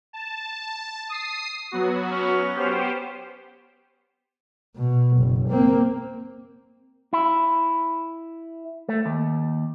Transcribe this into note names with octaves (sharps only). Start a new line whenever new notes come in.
A5
D#6 C7
F#3 B3 F#4
C#4
B3 G4 C5
B2
F#1
A#3 C4
E4
A3
D#2